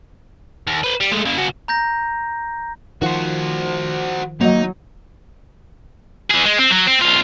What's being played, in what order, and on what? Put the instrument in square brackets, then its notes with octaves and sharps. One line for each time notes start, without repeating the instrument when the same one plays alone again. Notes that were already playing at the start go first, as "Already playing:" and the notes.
[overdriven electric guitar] D#2
B4 C5
G3
G#3 A3
C#3 A#3
C#3 F#4
[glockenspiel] A#5 G6 A#6
[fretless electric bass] D#3 F3 [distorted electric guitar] F#4 C5
[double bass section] F#3 [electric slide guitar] A#3 D#5 [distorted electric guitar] D#4
[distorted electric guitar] E3 G#4
G#3
C4
F#3
C4
B1 F4